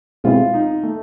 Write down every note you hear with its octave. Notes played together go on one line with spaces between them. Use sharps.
B2 G#3 C4 E4 F4 G#4
D#4
A3